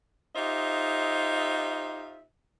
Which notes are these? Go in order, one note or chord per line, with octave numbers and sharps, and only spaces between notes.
D#4 F4 G4 C5 D#5 E5